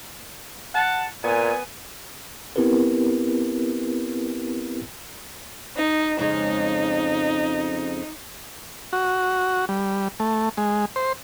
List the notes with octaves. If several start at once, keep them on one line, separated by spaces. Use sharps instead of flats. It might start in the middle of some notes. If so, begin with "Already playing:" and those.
F#5 A5
A#2 B3 G#5
B3 C4 E4 G4 A#4 B4
D#4
F2 C#3 G#3 D#4
F#4
G3
A3
G#3
C5